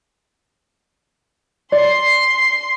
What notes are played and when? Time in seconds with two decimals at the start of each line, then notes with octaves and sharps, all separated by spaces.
1.72 D5 C6 C7